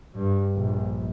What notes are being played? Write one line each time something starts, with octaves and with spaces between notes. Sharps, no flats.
G2
A#1